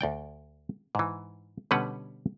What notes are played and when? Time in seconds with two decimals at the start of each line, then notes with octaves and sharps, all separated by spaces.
0.01 D2 D5 G5
0.95 G#2 E3
1.71 B2 D3 G3 C#4 B4 F#5